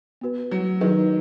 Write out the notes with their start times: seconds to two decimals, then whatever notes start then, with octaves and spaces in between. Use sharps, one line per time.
0.21 B3 F#4 B4
0.51 F#3
0.81 D#3 F#3 D#4 G#4 B4